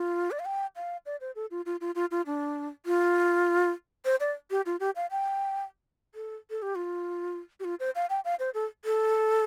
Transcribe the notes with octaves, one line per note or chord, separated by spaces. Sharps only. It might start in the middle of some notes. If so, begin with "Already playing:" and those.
Already playing: F4
D5
F5
G5
F5
D5
C5
A4
F4
F4
F4
F4
F4
D4
F4
C5
D5
G4
F4
G4
F5
G5
A4
A4
G4
F4
G4
F4
C5
F5
G5
F5
C5
A4
A4